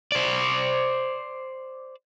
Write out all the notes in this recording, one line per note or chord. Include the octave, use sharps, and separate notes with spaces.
C5 D5